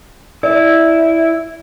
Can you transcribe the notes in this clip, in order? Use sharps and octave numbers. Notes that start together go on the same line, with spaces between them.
E4 D5